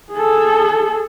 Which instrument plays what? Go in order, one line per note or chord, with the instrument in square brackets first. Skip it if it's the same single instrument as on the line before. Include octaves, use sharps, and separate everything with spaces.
[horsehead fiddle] G#4 A4